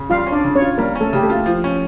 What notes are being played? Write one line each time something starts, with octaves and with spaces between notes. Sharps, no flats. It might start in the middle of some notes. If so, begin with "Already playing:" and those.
Already playing: C#3
G3 F4 F5
C#4
D4 D5
C#3
C#4 C#5
F4
G3 A#3 A#4
C#4
A3 A4
C#3 G4
A3 A4
F4
F3
C#4